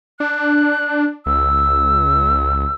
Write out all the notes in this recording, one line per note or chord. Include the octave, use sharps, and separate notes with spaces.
D4 F#6
C#2 E6